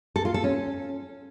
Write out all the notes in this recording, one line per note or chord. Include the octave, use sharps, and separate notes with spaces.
A4
F4
A4
C#4